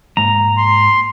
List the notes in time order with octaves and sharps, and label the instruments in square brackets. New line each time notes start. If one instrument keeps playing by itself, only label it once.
[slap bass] G#2 G#3 A#3 [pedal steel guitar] A#5
[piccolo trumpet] C6